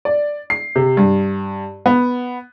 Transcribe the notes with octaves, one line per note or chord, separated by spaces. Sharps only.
D5
C7
C3
G2
B3